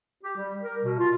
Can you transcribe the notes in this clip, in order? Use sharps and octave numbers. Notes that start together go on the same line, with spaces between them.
G4
G3
A#4
B2
F4